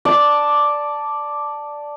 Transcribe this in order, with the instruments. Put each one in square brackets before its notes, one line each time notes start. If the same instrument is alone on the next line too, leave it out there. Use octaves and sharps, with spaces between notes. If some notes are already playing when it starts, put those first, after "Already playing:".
[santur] D5 A5